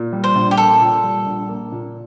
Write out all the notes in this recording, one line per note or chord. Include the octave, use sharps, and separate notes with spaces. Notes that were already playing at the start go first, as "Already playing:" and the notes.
Already playing: A#2
G3
C5
A#1
G4
A#3 A4
A#2
G3
A#1
A#3
A#2